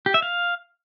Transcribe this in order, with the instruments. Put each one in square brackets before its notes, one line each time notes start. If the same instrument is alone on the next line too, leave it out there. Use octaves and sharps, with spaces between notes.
[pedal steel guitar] G4
E5
F5